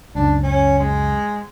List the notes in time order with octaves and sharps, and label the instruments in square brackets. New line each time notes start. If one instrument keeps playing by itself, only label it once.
[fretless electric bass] C#2 F#2 [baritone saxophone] D4
[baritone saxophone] C#4
G#3